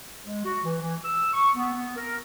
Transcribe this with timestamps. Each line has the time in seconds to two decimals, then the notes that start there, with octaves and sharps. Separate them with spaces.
0.23 G#3
0.45 F#4
0.64 E3
0.82 E3
1.04 E6
1.34 C#6
1.55 B3
1.73 B3
1.96 A#4